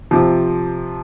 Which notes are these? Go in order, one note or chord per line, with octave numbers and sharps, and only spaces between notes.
C3 F3